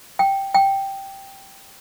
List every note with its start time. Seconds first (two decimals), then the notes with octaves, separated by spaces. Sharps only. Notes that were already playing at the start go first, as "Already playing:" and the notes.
0.19 G5
0.55 G5